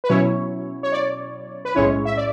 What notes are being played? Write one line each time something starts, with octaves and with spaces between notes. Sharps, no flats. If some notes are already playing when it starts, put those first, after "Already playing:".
B4
B2 F#3 C#4 E4 C#5
C#5
D5
B4
B1 A2 G#3 C#4 E4 C#5
E5
D5